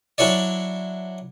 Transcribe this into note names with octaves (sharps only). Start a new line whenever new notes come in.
F#3 D4 E4 C#5 D5